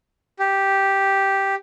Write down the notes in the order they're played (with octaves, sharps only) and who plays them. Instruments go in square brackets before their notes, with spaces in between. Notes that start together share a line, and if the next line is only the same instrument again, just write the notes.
[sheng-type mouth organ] G4